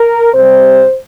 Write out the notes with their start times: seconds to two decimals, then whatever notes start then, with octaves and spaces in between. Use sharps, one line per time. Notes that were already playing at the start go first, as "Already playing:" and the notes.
Already playing: A#4
0.34 C3 G3 C5